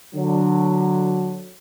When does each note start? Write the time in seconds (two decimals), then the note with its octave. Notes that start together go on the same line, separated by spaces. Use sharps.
0.15 D3 F#3